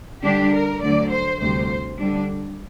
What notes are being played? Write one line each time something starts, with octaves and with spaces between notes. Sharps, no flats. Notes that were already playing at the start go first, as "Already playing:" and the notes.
D3 G3 D4 G4
A#4
D2 D3 F#3 D5
C5
D2 C3 G3 C5
D3 G3 D4